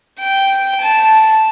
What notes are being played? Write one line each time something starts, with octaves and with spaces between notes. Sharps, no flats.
G5
A5